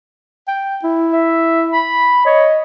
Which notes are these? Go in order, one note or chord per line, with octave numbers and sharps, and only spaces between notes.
G5
E4
E5
B5
C#5 D#5